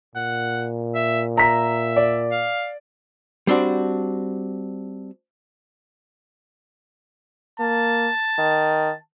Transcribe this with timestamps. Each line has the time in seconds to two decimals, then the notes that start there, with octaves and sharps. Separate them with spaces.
0.15 A#2 F#5
0.95 E5
1.37 E5 A#5 B6
1.96 D5
2.31 F5
3.47 G3 C4 D4 F#4
7.60 A#3 A5
8.38 D#3